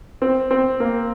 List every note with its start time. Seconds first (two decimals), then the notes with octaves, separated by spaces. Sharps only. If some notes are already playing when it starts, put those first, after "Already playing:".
0.22 C4
0.51 C4
0.80 A#3